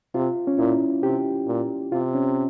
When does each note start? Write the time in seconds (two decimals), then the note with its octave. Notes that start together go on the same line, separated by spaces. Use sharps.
0.14 C3 F4
0.47 C#4
0.59 A#2 E4
1.03 C3 G4
1.47 A#2
1.92 C3 F4
2.14 C#4